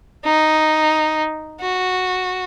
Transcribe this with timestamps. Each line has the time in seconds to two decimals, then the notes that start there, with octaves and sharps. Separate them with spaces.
0.24 D#4
1.61 F#4